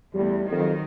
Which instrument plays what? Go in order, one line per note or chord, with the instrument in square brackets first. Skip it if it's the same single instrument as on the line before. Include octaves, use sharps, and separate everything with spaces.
[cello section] E2 A3 [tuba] G3
[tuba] F2 [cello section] D#3 F#3